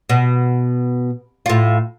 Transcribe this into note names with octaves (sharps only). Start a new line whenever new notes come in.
B2
A2 F4